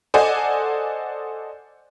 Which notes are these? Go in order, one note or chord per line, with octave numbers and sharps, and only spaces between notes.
A4 C5 D5 D#5 F#5 G#5